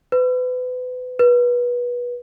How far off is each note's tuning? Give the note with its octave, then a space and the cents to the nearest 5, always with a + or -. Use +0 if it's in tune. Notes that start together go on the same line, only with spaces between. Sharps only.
B4 +30
B4 -25